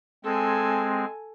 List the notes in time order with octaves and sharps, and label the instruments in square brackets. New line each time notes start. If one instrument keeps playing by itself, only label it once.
[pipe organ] G#3 C4 [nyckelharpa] A4 G#5